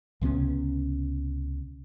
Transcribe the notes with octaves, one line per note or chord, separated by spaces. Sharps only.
C#2 C3 B3 C#4